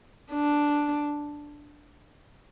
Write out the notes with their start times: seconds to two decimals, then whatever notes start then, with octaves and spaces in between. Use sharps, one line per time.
0.32 D4